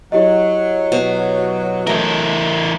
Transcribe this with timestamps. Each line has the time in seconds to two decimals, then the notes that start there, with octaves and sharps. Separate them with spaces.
0.12 F#3 E4 G4 D#5
0.92 B2
1.87 E3 A3 A#4